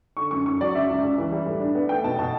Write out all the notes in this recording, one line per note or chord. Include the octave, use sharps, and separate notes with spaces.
D3 C#6
F#2 C#6
F#2 C#6
F#3 D5
C#3 E5
C#2
C#2
E3
G3
A2
D4
B3
A3 G5
B2 A5
B2 A5